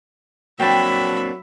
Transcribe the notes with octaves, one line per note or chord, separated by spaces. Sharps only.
F#3 A#3 C4 D4 E5 G5 A5 B5